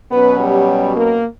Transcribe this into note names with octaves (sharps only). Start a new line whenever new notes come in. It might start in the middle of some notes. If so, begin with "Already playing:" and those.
B2 F#3 B3 C#4 B4
G3 G4
A#3 A#4